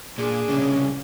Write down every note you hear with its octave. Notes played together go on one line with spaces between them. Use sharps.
A#2 D4 G#4
C2 C#3 C#4